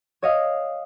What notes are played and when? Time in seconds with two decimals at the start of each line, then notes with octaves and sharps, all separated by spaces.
0.22 C#5 D#5 F5